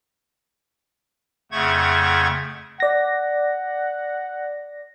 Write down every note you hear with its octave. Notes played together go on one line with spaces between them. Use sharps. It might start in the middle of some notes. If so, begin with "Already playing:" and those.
F2 C#3 A3 F#5 C#6 G#6
D5 F#5 A#6